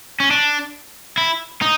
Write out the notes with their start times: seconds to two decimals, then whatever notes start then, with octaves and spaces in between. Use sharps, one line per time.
0.20 C#4
0.31 D4
1.18 E4
1.62 D#4